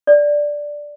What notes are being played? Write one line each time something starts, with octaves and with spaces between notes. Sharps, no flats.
D5